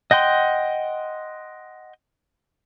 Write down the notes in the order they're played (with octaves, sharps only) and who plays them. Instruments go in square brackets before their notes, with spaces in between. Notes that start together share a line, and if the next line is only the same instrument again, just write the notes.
[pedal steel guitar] D#5 F#5 G5 C6